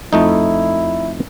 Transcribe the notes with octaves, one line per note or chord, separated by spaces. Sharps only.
F2 A3 D#4 E4